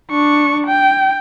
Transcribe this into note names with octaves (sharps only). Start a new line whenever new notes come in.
D4 C#6
G5